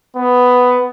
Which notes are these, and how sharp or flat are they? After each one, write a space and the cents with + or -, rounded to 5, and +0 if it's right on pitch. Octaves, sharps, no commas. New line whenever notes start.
B3 +10